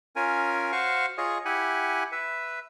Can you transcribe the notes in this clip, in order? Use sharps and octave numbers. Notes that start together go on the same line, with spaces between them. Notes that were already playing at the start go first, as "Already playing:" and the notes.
C#4 F4 A#4 G#5
F#4 C5 F5 C#6
F4 G#4 C#5 D#5
E4 G4 F#5 G#5
B4 E5